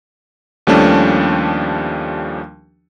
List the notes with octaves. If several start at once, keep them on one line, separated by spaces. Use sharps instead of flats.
D#2 F3 G3 A3 C#4 D4